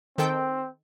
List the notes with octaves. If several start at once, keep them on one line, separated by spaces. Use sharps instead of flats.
D#3 C4 A4 G5